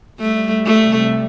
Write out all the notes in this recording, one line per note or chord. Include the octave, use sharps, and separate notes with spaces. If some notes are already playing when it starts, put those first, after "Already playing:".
G3 A3
G3
A3
C3